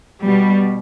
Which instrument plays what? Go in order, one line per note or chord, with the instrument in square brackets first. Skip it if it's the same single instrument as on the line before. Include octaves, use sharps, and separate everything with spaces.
[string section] B2 G3